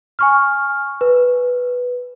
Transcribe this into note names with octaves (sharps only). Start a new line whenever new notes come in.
G#5 C#6 F6
B4